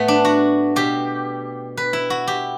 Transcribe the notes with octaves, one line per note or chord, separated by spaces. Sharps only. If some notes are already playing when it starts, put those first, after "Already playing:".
Already playing: A2 A3 B3
D4
F#4
B2 G4
B4
E4
F#4
G4